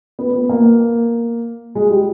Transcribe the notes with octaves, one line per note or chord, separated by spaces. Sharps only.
B3
B3
A#3
G#3
G3